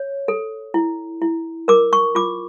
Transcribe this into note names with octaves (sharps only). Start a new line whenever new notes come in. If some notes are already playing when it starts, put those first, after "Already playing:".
Already playing: C#5
A4
E4
E4
A#4 D6
C#6
F4 D6